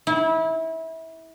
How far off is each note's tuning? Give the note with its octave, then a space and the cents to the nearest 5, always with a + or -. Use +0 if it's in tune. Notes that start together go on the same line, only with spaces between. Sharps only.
E4 -25